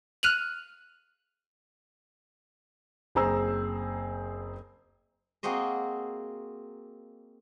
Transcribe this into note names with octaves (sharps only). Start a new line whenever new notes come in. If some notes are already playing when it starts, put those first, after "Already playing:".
F6 F#6 D#7 F7 F#7
F#1 C4 G#4 C5 A#5 E6
A#3 C4 F#4 G#4 C5 D#5